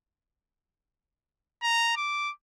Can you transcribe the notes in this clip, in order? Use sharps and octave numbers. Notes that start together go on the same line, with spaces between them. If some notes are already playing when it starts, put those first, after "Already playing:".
A#5
D6